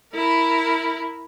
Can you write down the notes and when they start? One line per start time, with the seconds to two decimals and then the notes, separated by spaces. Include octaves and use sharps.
0.14 E4 A#4